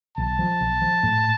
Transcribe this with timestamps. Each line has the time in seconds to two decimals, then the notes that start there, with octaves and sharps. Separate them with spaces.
0.17 B1 A5
0.39 F3
0.61 B1
0.82 F3
1.03 A2